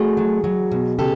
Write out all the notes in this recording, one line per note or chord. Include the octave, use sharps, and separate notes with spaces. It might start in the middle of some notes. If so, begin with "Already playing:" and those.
Already playing: A3 F#4 G#4
F#3
F#3
B2
C#3 G4 A4